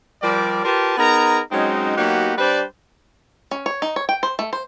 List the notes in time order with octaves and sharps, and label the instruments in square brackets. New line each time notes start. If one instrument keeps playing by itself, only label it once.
[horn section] F3 G3 G4 A#4 D5
F4 G4 A#4 B4 A5
B3 D#4 G#4 A#4 A#5
F#3 G#3 C4 C#4 D#4
F#3 A#3 B3 D#4 F#4 G4
G3 D4 B4 C5 D5
[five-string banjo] C#4
C#5
D#4
C#5
G5
C5
A3
C5